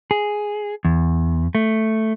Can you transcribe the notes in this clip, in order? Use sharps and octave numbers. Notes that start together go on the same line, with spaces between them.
G#4
E2
A3